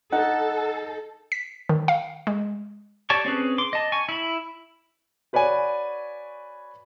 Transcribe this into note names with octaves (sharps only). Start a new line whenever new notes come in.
D#4 A4 F#5
B6
D#3
F5
G#3
G4 C#5 D5 A5 C#6
C4 C#4 G#4 B4
C6 D6
D#5 A5
G#5 C#6
E4 B5
F#4 B4 C#5 D5 G#5